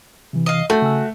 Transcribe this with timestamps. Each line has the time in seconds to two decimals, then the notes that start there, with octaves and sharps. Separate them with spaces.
0.33 C3 E3
0.46 D#5 F5
0.70 A3 F#4 A4 G6 A6
0.82 C#3 G#5 E6